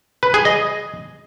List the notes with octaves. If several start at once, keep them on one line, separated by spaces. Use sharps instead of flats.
B4
G#4
D#5